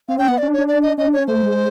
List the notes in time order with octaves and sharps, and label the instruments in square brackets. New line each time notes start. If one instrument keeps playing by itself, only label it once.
[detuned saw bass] C4 [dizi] F5
[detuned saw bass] C#4 [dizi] G5
[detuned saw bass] B3 [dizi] F#5
[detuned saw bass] C#4 [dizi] D5
[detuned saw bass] D4
[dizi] C#5
[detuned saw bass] D4
[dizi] D5
D#5
[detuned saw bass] C#4 [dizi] D#5
[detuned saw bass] D4
[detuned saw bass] C#4 [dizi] C#5
[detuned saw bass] A3 [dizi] C5
[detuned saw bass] G#3